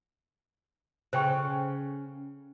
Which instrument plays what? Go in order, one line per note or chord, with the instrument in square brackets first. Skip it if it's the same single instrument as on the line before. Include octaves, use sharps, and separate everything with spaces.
[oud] C#3 [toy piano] C5 G5 C#6